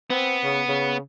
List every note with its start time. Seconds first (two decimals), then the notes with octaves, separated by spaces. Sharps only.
0.10 B3 C4
0.44 C#3
0.68 C#3